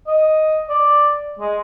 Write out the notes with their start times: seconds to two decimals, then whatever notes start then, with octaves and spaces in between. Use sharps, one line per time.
0.07 D#5
0.69 D5
1.39 G#3